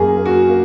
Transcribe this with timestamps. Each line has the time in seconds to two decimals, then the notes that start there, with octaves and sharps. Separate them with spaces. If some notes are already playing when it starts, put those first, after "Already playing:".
Already playing: F#2 A#3 G#4
0.18 A#3
0.26 F#4
0.49 A#3